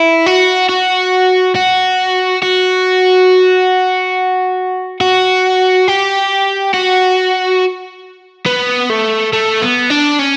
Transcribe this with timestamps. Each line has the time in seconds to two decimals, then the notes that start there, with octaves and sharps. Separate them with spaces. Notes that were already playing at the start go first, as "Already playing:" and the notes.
Already playing: E4
0.26 F#4
0.69 F#4
1.56 F#4
2.42 F#4
5.01 F#4
5.88 G4
6.74 F#4
8.46 B3
8.90 A3
9.33 A3
9.62 B3
9.90 D4
10.19 C#4